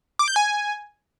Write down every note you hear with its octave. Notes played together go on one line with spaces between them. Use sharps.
D6
G6
G#5